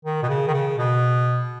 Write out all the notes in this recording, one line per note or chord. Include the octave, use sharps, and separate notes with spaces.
D#3
B2
C#3
D#3
C#3
B2